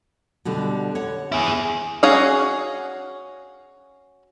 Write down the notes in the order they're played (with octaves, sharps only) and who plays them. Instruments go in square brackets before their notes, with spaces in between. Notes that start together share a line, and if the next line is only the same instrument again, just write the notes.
[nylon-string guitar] B2 D3 G3
C#5 F#5
[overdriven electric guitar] E4 G#4
[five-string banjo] C#4 F#4 G#4 F5